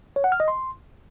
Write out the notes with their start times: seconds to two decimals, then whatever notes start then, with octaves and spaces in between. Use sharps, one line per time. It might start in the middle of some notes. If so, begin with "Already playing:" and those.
0.16 C#5
0.24 F#5
0.32 F6
0.40 D#5
0.48 C6